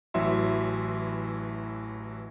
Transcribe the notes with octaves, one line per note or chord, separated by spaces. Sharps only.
A1 E3 F#3 E5 C6